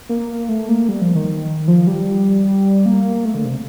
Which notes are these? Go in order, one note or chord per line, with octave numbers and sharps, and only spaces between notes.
A#3
A3
A#3
G3
F3
D#3
F3
G3
A#3
A3
D3
C3